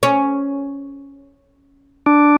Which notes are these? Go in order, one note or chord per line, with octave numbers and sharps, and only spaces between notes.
C#4
D4